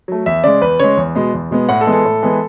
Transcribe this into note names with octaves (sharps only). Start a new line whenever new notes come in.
F#3 A3
E2 E5
C#3 G#3 D5
E2 B4
C#3 G#3 C#5
E2
B2 G#3 B3
E2
B2 G#3 B3
A2 F#5
A4
E3 G#3 B3
A4
A2
E3 G#3 B3